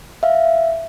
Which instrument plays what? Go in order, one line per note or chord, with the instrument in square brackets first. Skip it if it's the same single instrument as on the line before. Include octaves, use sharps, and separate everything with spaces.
[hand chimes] E5 F5